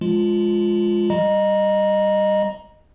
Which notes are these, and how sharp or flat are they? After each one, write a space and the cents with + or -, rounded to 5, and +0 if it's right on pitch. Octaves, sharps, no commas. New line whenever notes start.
F3 +0 G#3 +0 F4 +0
G3 +0 D#5 -15 A#5 +20